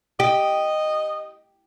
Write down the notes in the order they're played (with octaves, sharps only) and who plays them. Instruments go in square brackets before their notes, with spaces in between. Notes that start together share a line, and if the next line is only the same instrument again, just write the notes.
[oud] G4 [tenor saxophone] D#5